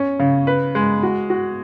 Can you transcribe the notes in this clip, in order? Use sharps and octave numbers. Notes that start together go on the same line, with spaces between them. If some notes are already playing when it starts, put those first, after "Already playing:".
Already playing: C#4
C#3
B4
G#3
F#4
F#4